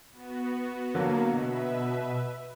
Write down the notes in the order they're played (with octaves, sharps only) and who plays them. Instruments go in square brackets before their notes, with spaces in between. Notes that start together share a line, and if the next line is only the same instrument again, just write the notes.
[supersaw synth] B3 F#4
[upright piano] D3 F#3 [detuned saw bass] A#3
[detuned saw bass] B2 [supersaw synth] B4 E5